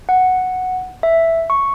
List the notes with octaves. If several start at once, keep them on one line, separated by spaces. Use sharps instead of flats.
F#5
E5
C#6